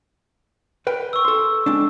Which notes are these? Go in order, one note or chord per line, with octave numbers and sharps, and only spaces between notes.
A#4 B4 G5
C#6 E6
A4 C6
G#3 C4 D4